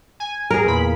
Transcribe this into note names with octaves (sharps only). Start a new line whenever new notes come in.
G#5
G#4 A#4
E2 A#2 B5